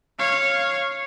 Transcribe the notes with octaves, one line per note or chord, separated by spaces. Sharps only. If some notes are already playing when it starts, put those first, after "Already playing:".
C#5 F5